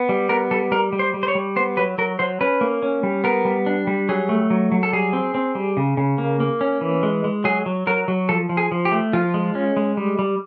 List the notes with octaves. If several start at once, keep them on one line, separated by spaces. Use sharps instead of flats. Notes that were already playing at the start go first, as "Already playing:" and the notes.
Already playing: B3
G3
B3 A#4
G3 A4
G3 A#4
G3
C5
G3
C5
C#5
G3
B3 C5
F#3 B4
F#3 A#4
F#3 C5
C#4 B4
A#3
C#4
G3
B3 A#4
G3
D4
G3
F#3 G#4
A3
F#3
F#3
A4
G3 G#4
C4
C4
G3
C#3
C#3
A#3
A#3
C#4
E3
G#3
G#3
F#3 G#4
F#3
F#3 A#4
F#3
F3 A4
F3
G#4
F3
G4
A3
F3 F4
G#3
C#4
G#3
G3
G3